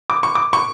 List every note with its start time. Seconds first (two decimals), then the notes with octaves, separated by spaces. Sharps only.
0.10 D6
0.23 C#6
0.35 D6
0.53 C#6